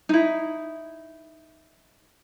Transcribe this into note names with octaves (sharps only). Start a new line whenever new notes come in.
D#4 E4